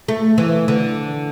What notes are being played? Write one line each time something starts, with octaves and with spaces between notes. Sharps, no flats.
A3
E3
D3